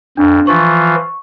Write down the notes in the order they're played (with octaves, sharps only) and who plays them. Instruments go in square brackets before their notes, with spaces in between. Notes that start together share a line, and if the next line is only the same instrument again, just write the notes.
[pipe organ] F2 [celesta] D4
[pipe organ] E3 F3 F4 [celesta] C#6